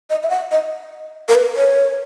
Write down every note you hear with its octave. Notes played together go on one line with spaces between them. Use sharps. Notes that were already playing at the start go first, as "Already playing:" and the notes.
D#5
E5
F#5
D#5
A#4
B4
C#5